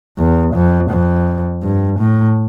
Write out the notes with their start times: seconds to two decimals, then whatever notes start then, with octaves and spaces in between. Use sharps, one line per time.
0.18 E2
0.55 F2
0.90 F2
1.63 G2
1.99 A2